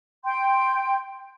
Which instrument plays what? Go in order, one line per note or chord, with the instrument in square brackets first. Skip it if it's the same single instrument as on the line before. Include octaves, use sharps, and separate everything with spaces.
[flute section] G5 C6 G6